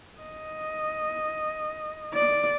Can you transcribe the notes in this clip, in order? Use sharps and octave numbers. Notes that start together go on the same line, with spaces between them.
D#5
D5